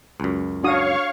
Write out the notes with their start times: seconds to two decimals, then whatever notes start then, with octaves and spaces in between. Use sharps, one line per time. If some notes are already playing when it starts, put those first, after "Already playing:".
0.20 C#2 F#2
0.63 D4 F#4 C#5 F5 C#6 D#6